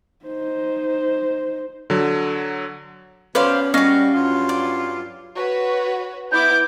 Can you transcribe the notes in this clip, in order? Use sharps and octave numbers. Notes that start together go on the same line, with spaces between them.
D#4 C5
D3 F#3
B2 F#3 C#4 B4 C5 D5 F5
G3 C#4 F#4 D#5 F5
G2 F#3 F4
D5
F#4 B4 C#5
B3 E4 D6 G6